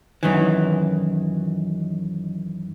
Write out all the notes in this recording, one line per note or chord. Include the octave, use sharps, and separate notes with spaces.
F#2 D#3 E3